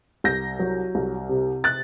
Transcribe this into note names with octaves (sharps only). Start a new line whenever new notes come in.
C2 G6 A#6
F#3
C2
C3
F#6 A6